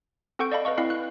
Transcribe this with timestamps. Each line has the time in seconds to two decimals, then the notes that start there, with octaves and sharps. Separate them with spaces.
0.39 C4 A4 F#5 C#6 G6 D7
0.52 D5 D#5 F5 A5 B5
0.65 B4 D#5 F5 C#6
0.78 C4 E4 F5 B5 C7
0.90 F#6